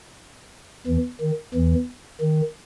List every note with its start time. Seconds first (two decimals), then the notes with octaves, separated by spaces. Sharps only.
0.87 E2 E3
1.21 D#3
1.54 E2 E3
2.21 D#3